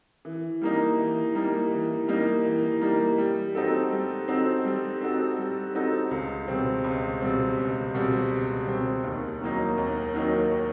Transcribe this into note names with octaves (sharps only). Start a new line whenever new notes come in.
E3
G3 A#3 D#4
E3
G3 A#3 D#4
E3
G3 A#3 D#4
E3
G3 A#3 D#4
G3
C4 D#4 F#4 A4
G3
C4 D#4 F#4 A4
G3
C4 D#4 F#4 A4
G3
C4 D#4 F#4 A4
C#2
B2 G3 C4
C#2
B2 G3 C4
C#2
B2 G3 C4
C#2
B2 G3 C4
D#2
D#3 F#3 A#3 D#4
D#2
D#3 F#3 A#3 D#4